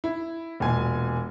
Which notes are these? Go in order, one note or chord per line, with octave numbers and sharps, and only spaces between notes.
E4
E1 A#2 G#5